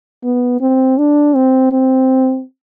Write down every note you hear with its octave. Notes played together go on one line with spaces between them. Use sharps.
B3
C4
D4
C4
C4